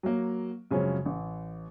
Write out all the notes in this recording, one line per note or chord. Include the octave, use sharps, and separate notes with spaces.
F#3 A#3
F#2 C#3 F3 G#3 C4 C#4
A1